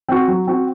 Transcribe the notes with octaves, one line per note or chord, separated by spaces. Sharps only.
C4 F#4
F#3
C4 F#4